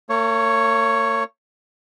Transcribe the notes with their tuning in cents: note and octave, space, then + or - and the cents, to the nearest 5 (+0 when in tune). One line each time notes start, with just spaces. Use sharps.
A#3 -45 C#5 +0